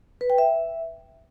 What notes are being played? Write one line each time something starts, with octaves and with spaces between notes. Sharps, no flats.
B4
G5
E5